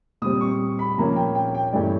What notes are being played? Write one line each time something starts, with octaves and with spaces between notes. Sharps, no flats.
A#2 G3 C4 D#6
C#6
B5
A#2 F3 A#3 C#4 A#5
G5
G5
G5
G2 E3 A3 C#4 D5